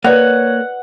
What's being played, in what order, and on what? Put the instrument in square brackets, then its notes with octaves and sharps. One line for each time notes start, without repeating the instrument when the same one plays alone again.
[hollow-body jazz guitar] A#3 [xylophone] B4 D5 [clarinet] C#5 [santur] F#5